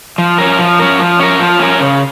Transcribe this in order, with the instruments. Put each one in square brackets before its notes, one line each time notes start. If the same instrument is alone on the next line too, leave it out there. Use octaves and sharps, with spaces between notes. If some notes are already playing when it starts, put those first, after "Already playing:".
[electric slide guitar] F3
C#4 A#4
F3
C#4 A#4
F3
C#4 A#4
F3
C#4 A#4
C#3